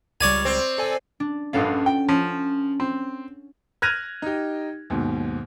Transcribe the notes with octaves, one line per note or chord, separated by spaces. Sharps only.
C#2 G3 C#5 D5 G#5
C4
A4 D5 G#5
D4
A#1 G2 C#4 A4 F5 F#5
G5
F3 C#4
C4
F6 F#6 G#6 A#6 D#7 F7
D#4 G4
D#2 G#2 B2